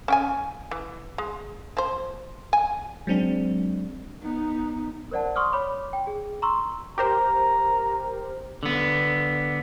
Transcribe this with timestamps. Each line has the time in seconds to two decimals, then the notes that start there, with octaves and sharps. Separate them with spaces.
0.08 C#4 G5 G#5
0.71 E3
1.18 G#3
1.77 F3 C5
2.53 G#5
3.07 F#3 G#3 C4 D4
4.23 B3 D#4
5.11 A#4 C5 D5 F#5 A5
5.36 C6 C#6 D#6 F6
5.52 C#5 B5 D6
5.93 G5
6.07 G#4
6.42 A#5 C6 C#6 E6
6.98 G4 A#4 C5 A#5
8.63 D3 B3